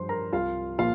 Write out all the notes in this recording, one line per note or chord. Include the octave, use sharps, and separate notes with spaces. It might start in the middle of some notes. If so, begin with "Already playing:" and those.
Already playing: G2 F3 C5 C6
A#4 A#5
C2 F4 F5
A#2 F3 F4 F5